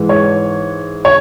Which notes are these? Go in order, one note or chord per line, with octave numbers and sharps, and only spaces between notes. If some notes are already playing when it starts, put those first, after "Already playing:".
Already playing: G#2 E3 G#3
C#5
C#5